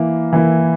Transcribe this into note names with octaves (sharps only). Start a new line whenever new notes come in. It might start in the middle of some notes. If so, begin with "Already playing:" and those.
Already playing: E3 A#3 E4
E3 A#3 E4